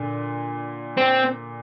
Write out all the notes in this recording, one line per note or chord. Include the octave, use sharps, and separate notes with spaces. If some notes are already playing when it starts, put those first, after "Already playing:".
Already playing: A#2 D3
C4